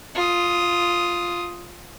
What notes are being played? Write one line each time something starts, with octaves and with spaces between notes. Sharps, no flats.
F4 D#6